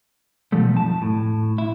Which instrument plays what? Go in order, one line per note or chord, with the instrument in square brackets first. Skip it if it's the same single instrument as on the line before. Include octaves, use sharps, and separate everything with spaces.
[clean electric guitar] B2 D#3 F3 G3 A3
F2 A5
A2
E4